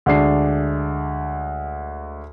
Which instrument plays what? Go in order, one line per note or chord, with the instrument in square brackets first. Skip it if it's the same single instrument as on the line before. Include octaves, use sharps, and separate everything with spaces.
[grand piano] D2 G#3 D4 C7